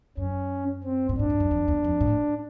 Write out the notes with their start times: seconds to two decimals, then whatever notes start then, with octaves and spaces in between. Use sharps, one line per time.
0.17 F#2 C#4
0.84 C4
1.09 A2
1.18 G#2 D4
1.30 G2
1.40 F#2
1.51 F2
1.68 E2
1.84 F2
2.01 A2